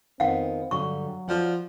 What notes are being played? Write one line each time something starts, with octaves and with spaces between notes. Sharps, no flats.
F2 D#3 B3 C4 F5 F#5
G2 D3 F#3 G3 C#6
F3 F#4 D5 F#5